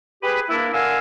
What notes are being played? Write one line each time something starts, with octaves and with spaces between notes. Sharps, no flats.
G4 G#4 B4
A#3 D4 E4
D3 A#4 F5 G#5 E6 F6